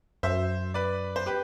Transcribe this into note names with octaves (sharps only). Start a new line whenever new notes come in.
F#2 C5 E5
B4 D5
C5
G4 B4